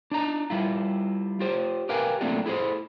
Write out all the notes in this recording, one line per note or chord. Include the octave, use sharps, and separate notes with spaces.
D4 D#4 A#5
G3 E4 F4
F4 G4 C5
G4 A#4 B4 F5 G5 G#5
F#3 A3 A#3 C4 D4 F4
E4 G#4 A4 C5